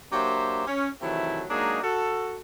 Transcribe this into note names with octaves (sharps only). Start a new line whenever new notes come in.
F#3 A#3 D4 G4 C5 E5
C#4
C3 D#3 E3 F#3 A3 E4
F#3 G#3 A#3 D4 D#4 G#4
F#4 A4